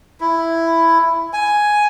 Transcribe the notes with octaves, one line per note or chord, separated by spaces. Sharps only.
E4
G#5